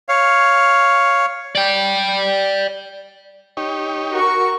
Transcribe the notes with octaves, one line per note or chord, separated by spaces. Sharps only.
C#5 F5
D5 G5
D#4 G4 C#5
F#4 A#4 C#6